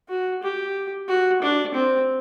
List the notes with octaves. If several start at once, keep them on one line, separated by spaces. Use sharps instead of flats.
F#4
G4
F#4
D4
C4